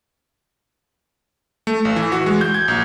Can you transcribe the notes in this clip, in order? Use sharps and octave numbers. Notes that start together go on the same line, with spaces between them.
A3
A1
E3
F#4
G#3
G6
G#6
A#1